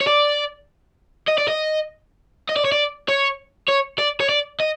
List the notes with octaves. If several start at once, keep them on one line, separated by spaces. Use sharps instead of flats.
C#5
D5
D#5
D5
D#5
D#5
D5
C#5
D5
C#5
C#5
D5
C#5
D5
D#5